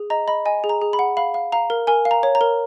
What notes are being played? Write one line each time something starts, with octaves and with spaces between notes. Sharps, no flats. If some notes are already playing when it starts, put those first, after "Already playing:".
Already playing: G#4
D#5 A#5
D#5 B5
D#5 G#5
G#4
A#5
G#4
B5
F#5
F5 B5
F5
F5 A#5
A#4
A#4 G#5
F5
A#5
C#5
A#5
A#4